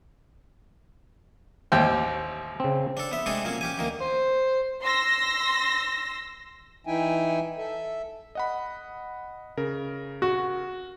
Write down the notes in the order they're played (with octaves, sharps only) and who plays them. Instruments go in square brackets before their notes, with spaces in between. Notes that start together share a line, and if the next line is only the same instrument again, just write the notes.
[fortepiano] A1 D#2 G5 [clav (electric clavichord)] C5
[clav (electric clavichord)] C#3 C4
[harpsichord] D4 A4
B3 E5
C3 G#3 A3 D4 G#4 A4
A#2 F#3 C#4
C#4 G4 G#5
D2 D#3 A#3
[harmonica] C5
[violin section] C6 E6 A#6
[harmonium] E3 D#4 E4 E5 G5 G#5
A4 E5
[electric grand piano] D#5 F#5 B5
C#3 A#4
[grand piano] F#4